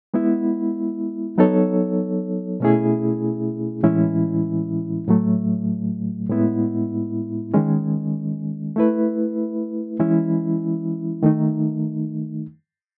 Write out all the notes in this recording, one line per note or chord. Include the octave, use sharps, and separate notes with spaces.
G#3 B3 E4
F#3 B3 D#4 A4 C#5
B2 A3 C#4 E4 G#4
A2 E3 G#3 C#4 E4
A2 F#3 A3
A2 G#3 B3 E4
D#3 G#3 C#4
A3 E4 B4
E3 G#3 C#4 E4
D#3 A3 D#4